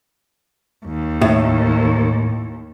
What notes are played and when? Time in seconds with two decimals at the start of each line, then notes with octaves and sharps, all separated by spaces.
0.86 D#2
1.21 A2